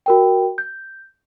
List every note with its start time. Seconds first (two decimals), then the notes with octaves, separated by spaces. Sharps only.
0.06 F#4 A#4 G5
0.58 G6